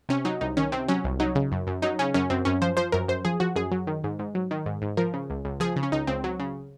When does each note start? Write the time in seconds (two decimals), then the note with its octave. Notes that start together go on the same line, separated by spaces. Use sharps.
0.09 C3 C#4
0.25 F#3 D#4
0.41 C2 D#4
0.57 D#3 C#4
0.72 C3 C4
0.88 F#3 C#4
1.04 C2
1.20 F#3 D#4
1.35 C#3
1.52 F#2
1.67 F#2
1.82 F#3 D#4
1.99 C#3 C#4
2.14 F#2 C#4
2.30 F#2 C4
2.45 F#2 C#4
2.62 F3 C5
2.77 F3 C5
2.92 F#2 A#4
3.08 F#2 C5
3.25 F3 G#4
3.40 F3 F#4
3.56 F#2 G#4
3.72 F#3
3.87 D#3
4.04 G#2
4.19 G#2
4.35 F#3
4.51 D#3
4.66 G#2
4.82 G#2
4.97 F3 A#4
5.14 C#3
5.30 C#2
5.45 C#2
5.60 F3 G#4
5.76 C#3
5.83 C#4
5.92 C#2 D#4
6.07 C#2 C4
6.24 F#3
6.40 C#3